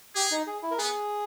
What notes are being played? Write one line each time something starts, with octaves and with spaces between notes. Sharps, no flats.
G4 G#4
D#4
G#4
E4
A#4
B3 G#4